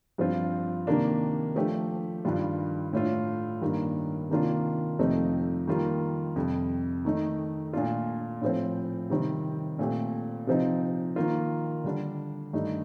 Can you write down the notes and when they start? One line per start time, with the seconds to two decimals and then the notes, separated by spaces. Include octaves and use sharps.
0.18 G2 F3 C4 F4
0.87 C3 D#3 A#3 D4
1.56 F3 A3 D4 G4
2.25 G2 D#3 G3 D4 F4
2.93 A2 A3 D4 F4
3.62 G2 D#3 A#3
4.30 C3 D#3 A#3 D4 F4
4.99 F2 C3 F3 A3 D#4
5.67 D#3 G3 A#3 F4
6.36 F2 C3 G3
7.05 D#3 A3 D#4
7.73 A#2 A3 D4 F4
8.42 A2 F3 C4
9.10 C3 D#3 G3 C4
9.79 A#2 A3 C4 G4
10.47 C3 F3 C4 D#4
11.16 D#3 A#3 F4
11.84 D3 G3 D4
12.53 G2 D#3 A3 D#4